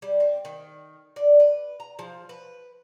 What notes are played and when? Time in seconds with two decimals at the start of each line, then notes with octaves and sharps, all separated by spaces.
0.02 G3
0.20 C4
0.45 D#3
1.16 D5
1.40 B4
1.80 A#5
1.99 F3
2.29 B4